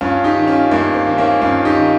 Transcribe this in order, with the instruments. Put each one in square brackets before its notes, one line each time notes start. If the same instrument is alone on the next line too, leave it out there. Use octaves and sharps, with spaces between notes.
[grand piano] G2 C#4 F4
D#4 G4
D#3
C#4 F4
G2 A#3
C4
D#3
A#3 C#4
G2 C#4 F4
D#4 G4
D#3